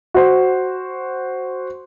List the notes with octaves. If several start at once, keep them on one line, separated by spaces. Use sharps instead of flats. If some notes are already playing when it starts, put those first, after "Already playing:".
F#4 C5